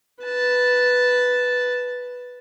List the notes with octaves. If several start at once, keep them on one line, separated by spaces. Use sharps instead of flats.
B4 A5